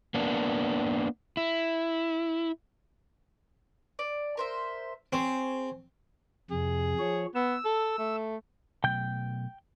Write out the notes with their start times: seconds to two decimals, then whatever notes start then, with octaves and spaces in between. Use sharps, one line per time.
0.14 A#3 B3 D4
1.37 E4
3.99 D5
4.37 A#4 C5 E5
5.13 C4 G#4 C5 C#5
6.51 F2 C3 G#4
6.99 F3 C#5
7.35 B3 E6
7.65 A4
7.99 A3
8.84 B2 F#3 A3 G5 G6